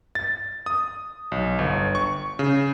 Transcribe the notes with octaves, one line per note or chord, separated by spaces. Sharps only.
A6
D#6
B1
G1
C#6
C#3